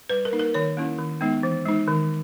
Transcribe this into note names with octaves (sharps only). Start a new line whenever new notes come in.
G3 B4
A#4
A#3 D#4
A#4
D#3 C#5
A#3 C#4 E4
D#3
G#3 B3 D#4
E3
G#3 D#4
D#3